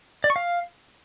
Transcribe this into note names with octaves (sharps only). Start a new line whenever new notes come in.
D5
C#6
F5